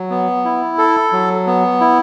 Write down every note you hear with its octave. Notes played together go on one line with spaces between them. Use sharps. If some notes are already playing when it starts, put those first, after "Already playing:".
Already playing: F#3
B3
E4
A4
F#3
B3
E4